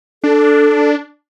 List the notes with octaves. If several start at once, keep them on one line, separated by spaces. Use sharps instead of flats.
D4 A4